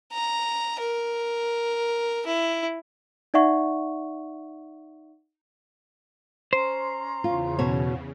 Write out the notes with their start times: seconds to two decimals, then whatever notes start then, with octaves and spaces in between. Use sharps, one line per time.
0.13 A#5
0.80 A#4
2.27 E4
3.34 D#4 D5 E5 F#5 C#6
6.53 C#4 C5 A#5 C6
7.24 E2 C#3 F4
7.59 B2 F#4 C#5